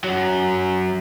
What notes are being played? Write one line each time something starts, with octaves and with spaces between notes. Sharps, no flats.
F#2 F#3